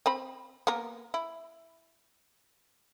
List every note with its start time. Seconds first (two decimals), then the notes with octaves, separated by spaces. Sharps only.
0.06 C4 C5 B5
0.67 A#3 B3 A#4
1.14 E4